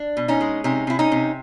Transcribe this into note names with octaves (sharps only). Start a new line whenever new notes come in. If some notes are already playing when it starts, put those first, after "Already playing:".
Already playing: D4
B2
C#4 D#4
G#3
C3 C#4 D#4
C3 E4
C#4 D#4
C3